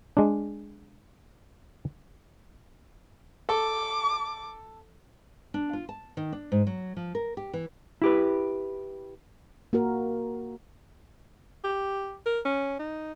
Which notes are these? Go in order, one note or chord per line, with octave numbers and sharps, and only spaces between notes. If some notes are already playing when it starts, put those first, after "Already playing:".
G#3 D4
A4 D6
D4
F4
A5
D#3
D4
G#2
F#3
F3
A#4
G4
E3
E4 G4 B4
A#3 F#4 A#4
G4
A#4
C#4
D#4